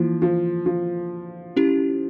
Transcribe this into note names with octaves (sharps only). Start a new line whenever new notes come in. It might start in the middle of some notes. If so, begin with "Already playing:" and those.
Already playing: E3 F3 A#3 E4
F3
F3
C#4 E4 G4